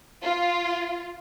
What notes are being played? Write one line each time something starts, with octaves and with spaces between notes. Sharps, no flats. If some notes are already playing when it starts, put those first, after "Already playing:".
F4